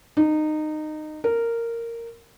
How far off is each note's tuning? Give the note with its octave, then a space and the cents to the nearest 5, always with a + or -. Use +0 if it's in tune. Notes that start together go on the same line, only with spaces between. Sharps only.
D#4 -20
A#4 -10